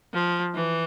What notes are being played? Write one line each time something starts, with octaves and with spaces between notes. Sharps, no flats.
F3
E3